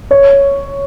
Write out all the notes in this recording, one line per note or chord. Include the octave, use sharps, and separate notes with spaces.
C#5